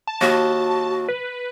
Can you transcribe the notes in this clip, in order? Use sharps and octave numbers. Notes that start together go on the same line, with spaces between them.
A5
D#2 F#4
B4